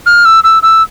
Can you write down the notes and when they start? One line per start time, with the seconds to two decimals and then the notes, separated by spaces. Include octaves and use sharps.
0.06 F6
0.25 E6
0.44 E6
0.63 E6